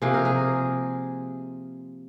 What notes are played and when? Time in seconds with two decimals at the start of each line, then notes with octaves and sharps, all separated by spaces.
0.02 C3 F3 A#3 G#4
0.14 A#4
0.25 G#4